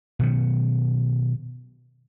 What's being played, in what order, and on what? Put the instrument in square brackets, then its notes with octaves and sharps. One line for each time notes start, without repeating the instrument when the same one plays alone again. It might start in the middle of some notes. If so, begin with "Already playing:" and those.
[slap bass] B2 D#3 F#3